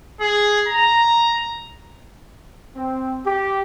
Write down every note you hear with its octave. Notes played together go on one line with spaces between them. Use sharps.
G#4
A#5
C4
G4